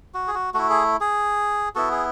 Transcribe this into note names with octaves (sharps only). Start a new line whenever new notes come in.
F#4
G#4
F#4
A3 E4 F#4
G#4
G#4
B3 E4 F#4 A4
G#4